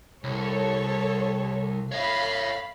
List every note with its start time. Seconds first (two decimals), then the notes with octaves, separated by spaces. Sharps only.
0.24 C2 A4 C#5
1.92 C#5 E5 F5 B5